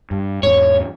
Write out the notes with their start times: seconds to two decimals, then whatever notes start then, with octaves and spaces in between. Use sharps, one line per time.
0.11 G2
0.43 E2 G#2 C#5